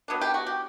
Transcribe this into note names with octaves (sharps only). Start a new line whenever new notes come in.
F#3 B3 D4
G4
F#4
G4